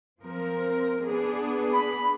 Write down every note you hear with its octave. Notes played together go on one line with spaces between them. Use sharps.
F3 C4 A#4
B3 D4 G#4
B5